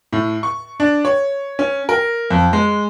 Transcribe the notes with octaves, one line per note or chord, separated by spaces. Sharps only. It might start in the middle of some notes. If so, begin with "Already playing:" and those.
A2
C#6
D4
C#5
C#4
A#4
F2
G#3